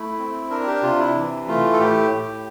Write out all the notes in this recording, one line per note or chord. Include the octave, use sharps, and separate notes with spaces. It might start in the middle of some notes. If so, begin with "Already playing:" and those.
Already playing: A3 E4
C4
D4 A#4
G4
C3 F4
E4
E3
A3 F4
A4
A2 G4
A2